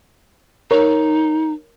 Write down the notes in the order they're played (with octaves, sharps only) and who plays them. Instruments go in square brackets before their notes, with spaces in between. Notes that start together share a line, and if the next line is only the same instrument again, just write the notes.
[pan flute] D#4 [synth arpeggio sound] A#4 C#5